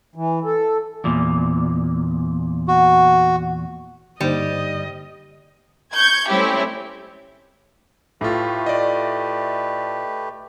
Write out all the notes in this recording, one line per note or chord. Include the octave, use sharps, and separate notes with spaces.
E3
A4
E2 A#2
F#4
G2 D3 G3 A#3 D#4 C5 D#5
C#6 G6 G#6
G3 A3 C4 C#4 E4 G4
A2 A3 F4 G4 B4
D5 D#5